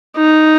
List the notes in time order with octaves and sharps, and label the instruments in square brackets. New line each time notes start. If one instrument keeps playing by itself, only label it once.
[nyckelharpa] D#4